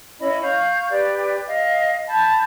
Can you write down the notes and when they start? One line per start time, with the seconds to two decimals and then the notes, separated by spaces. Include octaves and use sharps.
0.20 C#4 E4 D#5 B5
0.43 F5 C#6 G6
0.90 G4 B4 D5
1.47 D#5 F5
2.07 A5 B5 G6